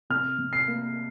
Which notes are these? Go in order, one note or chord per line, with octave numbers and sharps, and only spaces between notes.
C3 F6
C3
C7
A#3